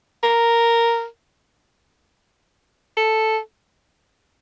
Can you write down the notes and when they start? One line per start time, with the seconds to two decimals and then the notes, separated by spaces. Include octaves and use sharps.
0.24 A#4
2.97 A4